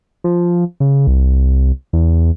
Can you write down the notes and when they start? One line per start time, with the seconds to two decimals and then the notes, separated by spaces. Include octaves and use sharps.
0.24 F3
0.80 C#3
1.07 C2
1.93 E2